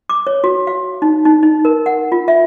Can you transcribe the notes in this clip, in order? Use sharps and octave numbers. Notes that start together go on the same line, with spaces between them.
D6
C#5
F#4
F5
D#4
D#4
D#4
A#4
F#5
F4
E5